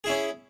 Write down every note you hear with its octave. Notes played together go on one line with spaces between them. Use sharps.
C#4 E4 G#4